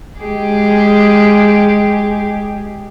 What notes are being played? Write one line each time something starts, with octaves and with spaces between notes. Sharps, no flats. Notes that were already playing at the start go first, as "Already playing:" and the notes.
G#3 G4 G#4